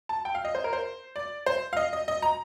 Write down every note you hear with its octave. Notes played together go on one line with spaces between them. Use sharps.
A5
G5
F5
D#5
C5
A#4
C5
D5
C5
F5
D#5
D#5
D#5
A#5